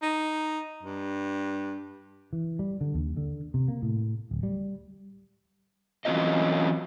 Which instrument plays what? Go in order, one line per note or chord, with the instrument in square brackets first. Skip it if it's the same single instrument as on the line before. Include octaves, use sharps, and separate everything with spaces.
[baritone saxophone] D#4
G2
[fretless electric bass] E3
G3
D3
D#2
D3
C3
A#3
A2
D1
G3
[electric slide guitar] E3 F#3 C4 C#4 F4 D#5